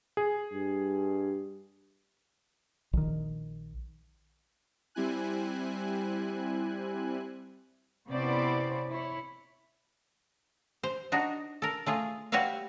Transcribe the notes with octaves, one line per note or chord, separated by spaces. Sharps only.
G#4
G2
A#1 D#3
G3 C4 E4 G#5 F#6
C3 B3 C#4 E4 C5 D5
E4 C#5
C5
D4 D#4 F#4
A4 A#4
A3 F4 G#4
G3 F#4 B4 C#5 E5 F5